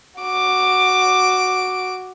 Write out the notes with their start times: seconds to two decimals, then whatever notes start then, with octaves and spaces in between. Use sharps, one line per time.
0.20 F#4 D6